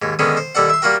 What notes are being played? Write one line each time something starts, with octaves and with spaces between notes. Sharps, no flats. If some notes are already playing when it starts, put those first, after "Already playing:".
D#2 G#2
D3 D#3 G#3 B3 C#4
C5
D#2 G3 A4 D5 F#5
E5 C6
G3 A#3 F4 F#4 A#4 G5